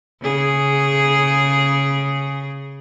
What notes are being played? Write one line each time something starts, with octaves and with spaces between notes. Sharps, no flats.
C#3 G#4